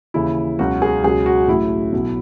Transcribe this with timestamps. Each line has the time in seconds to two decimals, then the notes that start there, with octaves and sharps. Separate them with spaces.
0.14 D#2 C#3 E3 E4
0.59 C#2 B2 F#3 F#4
0.82 G#4
1.04 C#2 B2 F#3 G#4
1.26 F#4
1.48 A1 A2 F#3 E4
1.92 B1 B2 F#3